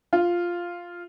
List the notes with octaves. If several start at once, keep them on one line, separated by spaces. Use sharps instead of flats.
F4